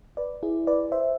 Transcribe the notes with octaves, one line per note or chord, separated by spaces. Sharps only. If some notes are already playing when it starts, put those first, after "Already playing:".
B4 D5
E4 G#4
B4 D5
C5 E5